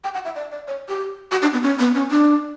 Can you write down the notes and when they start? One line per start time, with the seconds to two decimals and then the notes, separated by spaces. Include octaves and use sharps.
0.04 G5
0.14 F#5
0.25 E5
0.36 D5
0.52 D5
0.68 C#5
0.89 G4
1.32 F#4
1.42 D4
1.53 B3
1.63 C#4
1.79 B3
1.95 C#4
2.11 D4